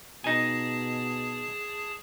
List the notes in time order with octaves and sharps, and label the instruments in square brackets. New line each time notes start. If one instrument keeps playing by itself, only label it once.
[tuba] B2 [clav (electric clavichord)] D#4 G#5 [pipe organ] G#4 A5